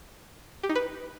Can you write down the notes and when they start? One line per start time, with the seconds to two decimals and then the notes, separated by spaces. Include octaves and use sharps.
0.63 G4
0.69 D#4
0.75 B4